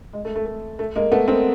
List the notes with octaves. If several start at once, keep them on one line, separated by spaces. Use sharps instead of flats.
G#3
A3
A3
A3
A3
G#3 A#3
A3 B3
A#3 C4